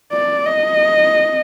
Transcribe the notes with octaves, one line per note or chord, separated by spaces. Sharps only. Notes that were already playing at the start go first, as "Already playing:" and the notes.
D5
D#5